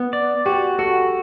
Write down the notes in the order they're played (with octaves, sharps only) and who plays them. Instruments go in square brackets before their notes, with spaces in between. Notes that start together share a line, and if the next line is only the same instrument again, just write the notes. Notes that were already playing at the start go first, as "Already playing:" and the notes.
Already playing: [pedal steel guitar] B3
D5
[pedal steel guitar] F#4 [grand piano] G4
[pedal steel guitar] F#4 [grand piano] A4